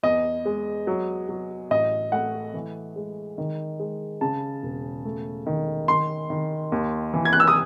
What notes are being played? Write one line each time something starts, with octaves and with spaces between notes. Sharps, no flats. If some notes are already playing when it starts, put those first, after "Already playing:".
E2 D#5
G#3
F#3
F#3
A1 D#5
A3 F#5
E3
G#3
D#3
G#3
C#3 A5
E1
A3
D#3
D#3 C6
D#3
D#2
E3
G#6
F#6
E6
D#6